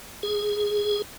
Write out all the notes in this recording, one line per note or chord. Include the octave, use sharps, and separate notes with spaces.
G#4